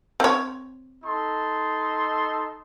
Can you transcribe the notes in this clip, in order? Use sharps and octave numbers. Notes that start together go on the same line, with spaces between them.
C4 C#5
D#4 A4 C6